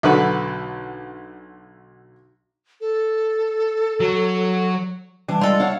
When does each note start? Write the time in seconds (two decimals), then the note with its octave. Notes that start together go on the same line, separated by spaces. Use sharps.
0.03 B1 D3 F#4 B4
2.81 A4
4.00 F#3
5.28 E3 G3 D4 A5
5.41 G#3 F4 A4 D5
5.60 E4 C#5 F5 F#5